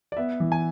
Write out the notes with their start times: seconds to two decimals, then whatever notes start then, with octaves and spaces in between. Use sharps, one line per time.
0.12 D5
0.17 B3 E5
0.40 E3
0.52 G#5